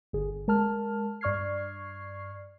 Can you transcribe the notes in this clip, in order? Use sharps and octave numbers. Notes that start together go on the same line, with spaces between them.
G1 D3 G#4
G#3 A#4 A5 F6
G2 D5 C#6 F6 G#6 C7